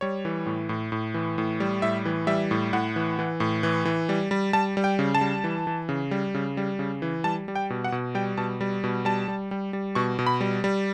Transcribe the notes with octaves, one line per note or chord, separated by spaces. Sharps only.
G3 C#5
E3
A2
A2
A2
E3
A2
G3
A2 E5
E3
G3 E5
A2
A2 F#5
E3
E3
A2
E3
E3
G3
G3
G3 A5
G3
G5
C#3
A5
G3
E3
E3
C#3
G3
C#3
G3
C#3
E3
G3 A5
G3
G5
B2
F#5
B2
G3 G5
B2 A5
G3
B2
G3 A5
G3
G3
G3
B2 C#6
B2
B5
G3
G3